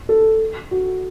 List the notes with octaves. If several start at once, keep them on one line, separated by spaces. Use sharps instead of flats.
A4
F#4